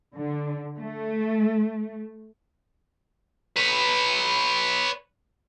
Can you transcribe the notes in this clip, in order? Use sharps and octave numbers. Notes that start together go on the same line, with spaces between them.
D3
A3
B4 C#5